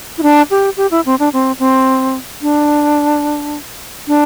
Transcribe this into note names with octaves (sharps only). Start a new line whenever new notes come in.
E4
D4
G4
G4
E4
C4
D4
C4
C4
D4
D4